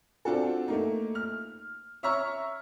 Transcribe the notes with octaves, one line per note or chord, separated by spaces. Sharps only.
C4 D4 F4 F#4 A4
A3 A#3 D#4
F6
C#5 E5 A#5 C#6 E6 F6